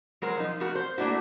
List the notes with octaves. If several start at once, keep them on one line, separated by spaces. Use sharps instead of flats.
F#3 G#3 A#4 C5
F3 D#4
F3 A3 F#4 A#4
C5
A3 A#3 D4 E4 F#4